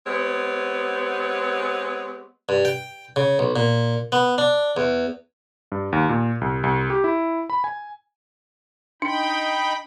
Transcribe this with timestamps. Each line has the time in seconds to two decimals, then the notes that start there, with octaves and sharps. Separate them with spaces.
0.06 G#3 B3 C4 G4 C#5
2.49 G2
2.65 G5
3.16 C#3
3.39 B1
3.56 A#2
4.12 B3
4.38 D4
4.77 E2
5.72 G2
5.92 D#2
6.09 A#2
6.41 C2
6.63 C2
6.90 G4
7.04 E4
7.50 B5
7.64 G#5
9.02 D4 D#4 G5 B5